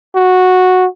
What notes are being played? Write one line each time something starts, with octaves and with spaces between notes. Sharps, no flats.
F#4